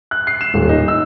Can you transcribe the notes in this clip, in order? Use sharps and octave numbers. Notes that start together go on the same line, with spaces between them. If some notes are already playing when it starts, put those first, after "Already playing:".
F#6
C7
E7
D#1
D#4
E6